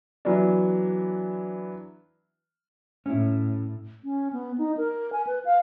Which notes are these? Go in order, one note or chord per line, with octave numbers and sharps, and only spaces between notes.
E3 F#3 B3 D4
A2 C#4 E4
C#4
B3
D#4
A#4
G#5
B4
F5